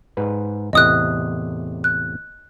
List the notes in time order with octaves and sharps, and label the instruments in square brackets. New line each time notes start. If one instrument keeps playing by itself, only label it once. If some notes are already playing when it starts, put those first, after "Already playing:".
[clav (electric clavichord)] G#2 B4
[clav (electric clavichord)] E2 A2 C3 [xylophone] D#5 D#6 F#6
[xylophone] F#6